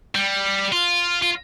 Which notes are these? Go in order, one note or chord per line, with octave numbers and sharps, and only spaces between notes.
G3
F4
F4